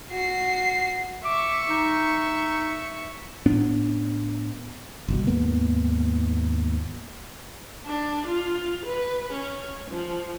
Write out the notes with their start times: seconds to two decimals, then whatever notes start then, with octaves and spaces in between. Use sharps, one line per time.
0.10 F#4 C7
1.25 E5 C#6 D6
1.69 D#4
3.46 A2 B3 C#4 D4
5.08 G1 C2 B2
5.27 D#2 G#2 A#3 B3
7.84 D4
8.25 F4
8.85 B4
9.31 C#4
9.89 F3